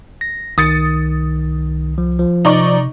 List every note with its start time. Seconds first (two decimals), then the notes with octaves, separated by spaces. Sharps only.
0.21 A#6
0.58 C2 D#3 D#6 A6 C#7
1.98 F3
2.19 F3
2.45 C3 D#4 D5 C#6